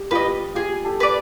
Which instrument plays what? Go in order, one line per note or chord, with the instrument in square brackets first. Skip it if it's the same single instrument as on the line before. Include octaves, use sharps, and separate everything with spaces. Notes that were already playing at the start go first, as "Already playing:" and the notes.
Already playing: [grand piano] G4
[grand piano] F4 G4 [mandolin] B4 D#5
[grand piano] F4 G4 [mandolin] G#4
[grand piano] G4 A4
[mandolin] B4 D5